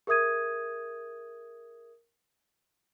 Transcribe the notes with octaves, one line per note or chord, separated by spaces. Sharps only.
G#4 A#4 E5 D#6 G#6 D#7